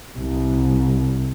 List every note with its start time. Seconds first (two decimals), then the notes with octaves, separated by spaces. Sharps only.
0.18 C2